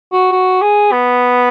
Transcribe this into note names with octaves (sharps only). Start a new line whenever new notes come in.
F#4
F#4
G#4
B3